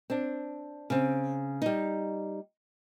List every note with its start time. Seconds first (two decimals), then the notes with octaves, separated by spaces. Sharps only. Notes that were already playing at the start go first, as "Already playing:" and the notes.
0.10 C4 D4
0.90 C#3 C4
1.62 G3 D#4